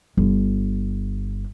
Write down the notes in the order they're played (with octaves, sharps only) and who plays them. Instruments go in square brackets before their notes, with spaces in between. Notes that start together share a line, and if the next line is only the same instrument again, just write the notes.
[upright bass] G1